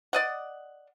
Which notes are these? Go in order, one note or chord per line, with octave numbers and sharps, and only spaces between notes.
D5 D#5 F#5